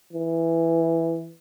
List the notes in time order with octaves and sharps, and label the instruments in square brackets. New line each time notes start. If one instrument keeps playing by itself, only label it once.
[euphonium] E3